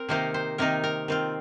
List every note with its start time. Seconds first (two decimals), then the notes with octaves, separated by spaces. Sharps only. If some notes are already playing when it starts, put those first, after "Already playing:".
Already playing: C4 A#4
0.09 C3 D#3 A#3 D#4 C5
0.34 C5
0.58 C3 D#3 A#3 D#4 A#4
0.84 A#4
1.08 D#3 C4 F4